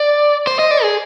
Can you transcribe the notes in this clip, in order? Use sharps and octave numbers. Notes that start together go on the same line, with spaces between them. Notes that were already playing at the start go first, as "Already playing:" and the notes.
Already playing: D5
C5
D#5
D5
G#4